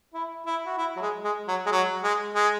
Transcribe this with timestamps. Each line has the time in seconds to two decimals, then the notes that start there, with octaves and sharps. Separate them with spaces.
0.14 E4
0.46 E4
0.66 F#4
0.78 E4
0.96 F#3
1.01 G#3
1.24 G#3
1.48 F#3
1.66 G#3
1.72 F#3
2.04 G#3
2.35 G#3